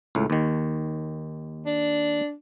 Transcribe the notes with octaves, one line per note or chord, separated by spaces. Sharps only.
C#2 A2
D#2 D#3
D4